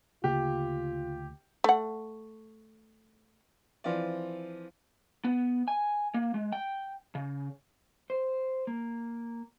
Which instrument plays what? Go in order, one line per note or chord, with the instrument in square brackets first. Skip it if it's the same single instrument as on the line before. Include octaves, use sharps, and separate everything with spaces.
[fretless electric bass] D2 C#3 A#3 [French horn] F4 [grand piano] G4
[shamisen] A3 F#5
[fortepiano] E3 F3 C4 F4 D5
[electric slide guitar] B3
G#5
A#3
G#3
G5
C#3
C5
A#3